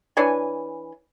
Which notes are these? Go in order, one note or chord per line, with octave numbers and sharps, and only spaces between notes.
E3 D4 C#5 G#5